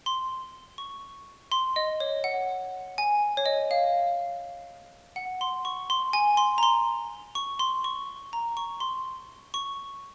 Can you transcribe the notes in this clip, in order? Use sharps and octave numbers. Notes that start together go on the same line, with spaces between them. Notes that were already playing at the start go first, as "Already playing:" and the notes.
C6
C#6
C6
D#5
C#5
F#5
G#5
C#5
D#5
F5
F#5
C6
C#6
C6
G#5
C6
A#5
C6
C#6
C6
C#6
A#5
C#6
C6
C#6